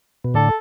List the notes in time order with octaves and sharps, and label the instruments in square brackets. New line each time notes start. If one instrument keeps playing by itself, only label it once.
[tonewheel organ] B2
[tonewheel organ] A2 D3 [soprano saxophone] A4